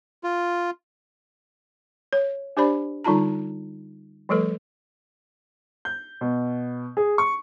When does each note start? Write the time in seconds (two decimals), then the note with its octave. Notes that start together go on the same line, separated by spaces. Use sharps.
0.24 F4
2.13 C#5
2.57 D4 G4 C5 D5 B5
3.04 D3 G3 D#4 F4 A5 A#5
4.29 F3 G3 A3 A4 B4
5.85 G6
6.21 B2
6.97 G#4
7.18 C#6